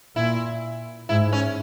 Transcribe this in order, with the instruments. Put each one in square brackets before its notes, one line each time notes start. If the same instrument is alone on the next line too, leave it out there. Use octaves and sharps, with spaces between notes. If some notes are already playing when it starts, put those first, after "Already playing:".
[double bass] A#2 [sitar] E4
[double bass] G#2 [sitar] E4
[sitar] C#4